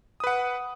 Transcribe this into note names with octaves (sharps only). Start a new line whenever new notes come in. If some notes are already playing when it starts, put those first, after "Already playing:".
B4 F#5 D#6